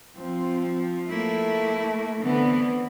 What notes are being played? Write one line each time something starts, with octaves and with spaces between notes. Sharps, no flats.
F3 C4
A3 A#3 E4
D3 E3 B3 C4